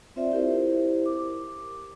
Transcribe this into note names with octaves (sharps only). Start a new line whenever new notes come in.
C4 F4 C5 D5 E5
E4 G4 A#4 C5
D6